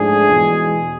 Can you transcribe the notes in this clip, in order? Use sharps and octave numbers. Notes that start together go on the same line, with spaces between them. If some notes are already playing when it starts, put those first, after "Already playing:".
Already playing: G#2 F3 A3 D4 G#4
E2 B2 G#3